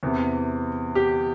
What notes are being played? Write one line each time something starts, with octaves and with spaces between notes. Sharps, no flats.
E2 C3 E3
G4